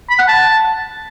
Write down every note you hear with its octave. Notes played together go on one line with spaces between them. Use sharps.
B5
F#5
A5